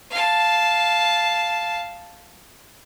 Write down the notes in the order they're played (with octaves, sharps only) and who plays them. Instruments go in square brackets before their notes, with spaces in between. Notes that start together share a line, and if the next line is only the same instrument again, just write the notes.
[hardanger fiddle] F5 A5